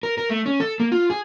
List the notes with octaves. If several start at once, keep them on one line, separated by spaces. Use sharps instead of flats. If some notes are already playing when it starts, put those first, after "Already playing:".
A#4
A#4
A3
C#4
A4
A#3
F4
G#4